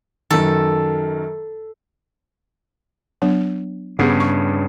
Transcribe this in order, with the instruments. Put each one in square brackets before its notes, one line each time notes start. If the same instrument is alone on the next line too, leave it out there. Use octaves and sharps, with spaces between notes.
[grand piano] F#2 D#3 [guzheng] A4
[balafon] F#3 B3 D4
[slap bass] G2 C#3 [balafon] B3 G4 G#4
[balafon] C#6